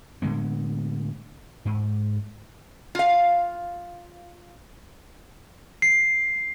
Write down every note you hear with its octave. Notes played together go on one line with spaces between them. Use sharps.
A2 D3 G#3 B3
G#2
F4 F5
C7